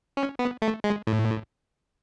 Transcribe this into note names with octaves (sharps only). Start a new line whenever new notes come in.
C#4
B3
A3
G#3
A2